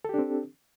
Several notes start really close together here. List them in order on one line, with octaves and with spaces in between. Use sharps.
A4 G4 D4 C4